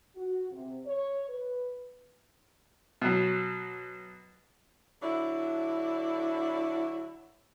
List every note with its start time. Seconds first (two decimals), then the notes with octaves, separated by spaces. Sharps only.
0.16 F#4
0.51 C3
0.86 C#5
1.28 B4
3.02 B2 F#3
5.03 D3 F#3 D4 E4